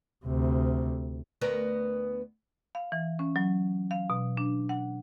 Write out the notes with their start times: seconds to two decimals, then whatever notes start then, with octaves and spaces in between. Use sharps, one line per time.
0.25 D2 C3
1.41 D2 B3 A#4
2.75 F5
2.92 E3
3.19 C#4
3.36 F#3
3.91 F5
4.10 B2
4.37 D4
4.69 F#5